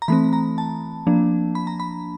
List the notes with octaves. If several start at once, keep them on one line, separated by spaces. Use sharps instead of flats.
A#5
E3 A3 C4 B5
A#5
A5
F3 A#3 D4
B5
A#5
B5